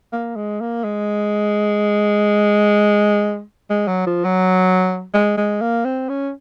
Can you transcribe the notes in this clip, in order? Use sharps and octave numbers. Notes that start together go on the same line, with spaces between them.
A#3
G#3
A#3
G#3
G#3
F#3
F3
F#3
G#3
G#3
A#3
C4
C#4